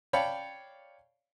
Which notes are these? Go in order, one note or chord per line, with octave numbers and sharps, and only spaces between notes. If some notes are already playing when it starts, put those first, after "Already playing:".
C#5 D5 F5 G5 A5 B5